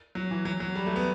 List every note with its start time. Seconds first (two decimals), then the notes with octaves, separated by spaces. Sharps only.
0.15 F#3
0.31 E3
0.45 F#3
0.60 F#3
0.75 G3
0.86 A3
0.96 B3